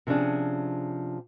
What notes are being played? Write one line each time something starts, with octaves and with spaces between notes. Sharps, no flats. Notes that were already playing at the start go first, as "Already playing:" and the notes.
C3 F3 C#4 D4 G#4